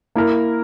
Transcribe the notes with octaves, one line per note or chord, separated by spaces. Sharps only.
A#3 E4 A#4